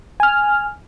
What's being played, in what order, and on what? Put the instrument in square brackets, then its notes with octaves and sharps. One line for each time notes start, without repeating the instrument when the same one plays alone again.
[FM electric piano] G#5 F6